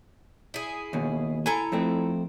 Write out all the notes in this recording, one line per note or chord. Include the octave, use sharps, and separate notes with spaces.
E4 G#4
D#2 B2
E4 A4 G#5 A#5
F2 A3 C4